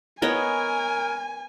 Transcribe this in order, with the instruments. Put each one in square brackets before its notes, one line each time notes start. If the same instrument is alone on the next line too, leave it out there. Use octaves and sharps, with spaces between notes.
[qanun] B3 C#5 D#5 [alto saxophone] A#4 [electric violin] G#5